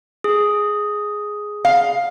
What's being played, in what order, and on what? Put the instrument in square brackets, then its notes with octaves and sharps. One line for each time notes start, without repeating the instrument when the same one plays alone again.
[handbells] G#4
[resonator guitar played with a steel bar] F5